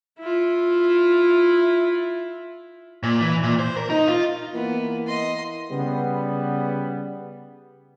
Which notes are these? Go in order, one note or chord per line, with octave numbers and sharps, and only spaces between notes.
E4 F4
A#2
E3
A#2
C5
A#4
D#4
F4
E3 A#3 B3
D#5 C6
C#3 G3 B3